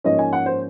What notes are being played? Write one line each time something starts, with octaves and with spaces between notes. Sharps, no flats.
G#2 F3 A#3 C#4 D#5
G#5
F#5
C5